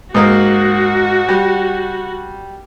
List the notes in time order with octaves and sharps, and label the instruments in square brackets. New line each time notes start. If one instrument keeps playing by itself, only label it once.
[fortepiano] G#2 A#3 [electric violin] F#4
[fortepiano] G3